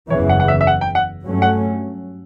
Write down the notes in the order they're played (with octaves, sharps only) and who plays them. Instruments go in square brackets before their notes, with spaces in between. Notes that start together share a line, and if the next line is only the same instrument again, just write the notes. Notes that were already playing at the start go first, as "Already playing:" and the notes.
[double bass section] F#1 E2 C#3 E3 [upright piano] C#5
[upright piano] F#5
F#5
E5
E5
F#5
G5
F#5
[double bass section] G2 F#3 A3 C#4
[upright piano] F#5